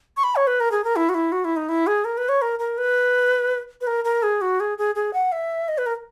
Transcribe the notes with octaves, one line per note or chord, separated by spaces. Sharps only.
C#6
B5
C#5
B4
A#4
G#4
A#4
E4
F#4
E4
F#4
E4
D#4
E4
G#4
A#4
B4
C#5
A#4
A#4
B4
B4
A#4
A#4
G#4
F#4
G#4
G#4
G#4
F#5
E5
D#5
B4
A#4